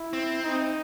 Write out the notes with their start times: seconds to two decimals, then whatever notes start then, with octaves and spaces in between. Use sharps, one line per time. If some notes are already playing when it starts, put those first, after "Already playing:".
Already playing: E4
0.13 C4
0.43 D#4